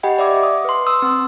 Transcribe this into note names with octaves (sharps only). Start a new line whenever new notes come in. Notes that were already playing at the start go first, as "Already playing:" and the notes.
G4 D#5 F#5 G5 B5
D5 E5 D6
D#6
B4 C6
C6 D#6 E6
C4 E6